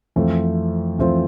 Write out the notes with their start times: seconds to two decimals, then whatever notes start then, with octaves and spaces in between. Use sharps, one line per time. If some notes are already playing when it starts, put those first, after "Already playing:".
0.16 F2 E3 A3 C4 F4
0.99 F2 E3 A3 C4 F4